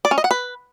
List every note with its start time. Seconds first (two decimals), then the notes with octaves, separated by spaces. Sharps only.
0.05 D5
0.11 C#4
0.18 D#5
0.24 F#5
0.31 B4